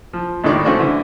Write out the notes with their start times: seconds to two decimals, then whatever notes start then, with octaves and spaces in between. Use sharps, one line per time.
0.13 F3
0.44 G#1 A2 D#3 D5 C#6
0.65 A3 C#4 F#4 C5 D5
0.79 D3 E3